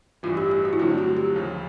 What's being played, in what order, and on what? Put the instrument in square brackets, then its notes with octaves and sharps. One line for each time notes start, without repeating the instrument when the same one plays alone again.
[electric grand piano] A1 G2 E3 [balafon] F4
[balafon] G4
G4
F#4
E4
[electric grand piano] G2 D3 F#3 A3 C4 [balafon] F4
[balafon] F#4
G4
[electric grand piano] D#2 C#3 F3